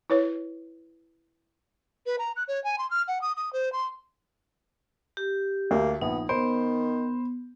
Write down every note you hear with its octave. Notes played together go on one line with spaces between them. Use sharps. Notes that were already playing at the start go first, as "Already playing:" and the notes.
E4 B4 C#5
B4
A#5
F#6
C#5
G#5
C6
F6
F#5
D#6
D#6
C5
C6
G4
D2 A#3
A#1 B3 D#4
D#3 B3 C5